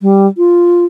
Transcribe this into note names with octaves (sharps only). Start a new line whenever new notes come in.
G3
F4